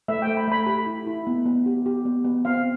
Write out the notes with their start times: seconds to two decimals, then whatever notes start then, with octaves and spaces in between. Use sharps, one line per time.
0.08 A3 E5
0.22 G5
0.27 A3
0.37 B5
0.47 A3 B5
0.67 G4 B5
0.87 E4
1.07 E4
1.27 B3
1.46 B3
1.66 G4
1.86 G4
2.05 B3
2.25 B3
2.45 C4 F5